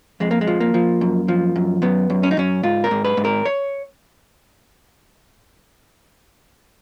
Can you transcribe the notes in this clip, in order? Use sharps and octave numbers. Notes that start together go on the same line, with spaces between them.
F2 G#3
A#3
G#3
F3
A#3
F3
F#2
F3
F#2
F#2 B3
F#2
C#4
D#4
F#2 C#4
G#2 F4
A#4
G#2
B4
G#2
A#4
C#5